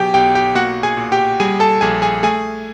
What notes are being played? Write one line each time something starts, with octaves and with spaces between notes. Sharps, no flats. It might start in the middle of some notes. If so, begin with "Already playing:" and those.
Already playing: B2 F#3 G4 G#4 G5
B1 G4 G5
G4 G5
A#3 F#4 F#5
G#4 G#5
A#2
G4 G5
G3 G#4 G#5
A4 A5
A#1 G#4 G#5
G#4 G#5
A3 G#4 G#5